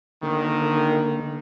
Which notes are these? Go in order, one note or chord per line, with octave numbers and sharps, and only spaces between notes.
G#1 D3 D#3 A#3